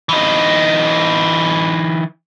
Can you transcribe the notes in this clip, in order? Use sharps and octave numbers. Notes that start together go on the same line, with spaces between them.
E3 D#4